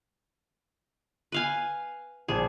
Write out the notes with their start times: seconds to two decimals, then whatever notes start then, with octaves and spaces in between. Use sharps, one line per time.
1.32 B4 F5 G#5
2.28 A#1 G#4